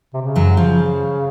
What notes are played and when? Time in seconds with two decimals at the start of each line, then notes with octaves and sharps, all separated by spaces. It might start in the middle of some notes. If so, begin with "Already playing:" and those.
0.14 C3
0.22 C#3
0.36 F#2 F#3
0.50 C#3
0.57 F3